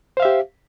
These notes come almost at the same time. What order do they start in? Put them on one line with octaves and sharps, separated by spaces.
C5 F5 E5 G4